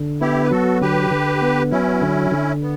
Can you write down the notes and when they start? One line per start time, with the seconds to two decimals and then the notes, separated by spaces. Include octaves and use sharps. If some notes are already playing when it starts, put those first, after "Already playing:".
Already playing: D3
0.21 B3 E4 G4
0.44 B4
0.51 F#3 F#4 A4
0.81 D3 G4 B4
1.11 D3
1.42 B3
1.71 F#3 C#4 E4
2.02 D3
2.31 D3
2.61 B3